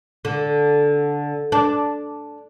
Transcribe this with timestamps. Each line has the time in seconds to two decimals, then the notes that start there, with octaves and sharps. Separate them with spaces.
0.25 D3
1.52 D4